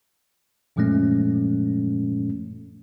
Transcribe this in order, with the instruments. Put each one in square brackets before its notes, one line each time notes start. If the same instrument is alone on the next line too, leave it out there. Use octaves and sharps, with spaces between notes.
[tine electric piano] F#2 A#2 F3 G#3 A3 C#4